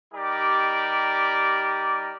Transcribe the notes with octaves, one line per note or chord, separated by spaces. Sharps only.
G3 D#4 G4 A#4 D5 D6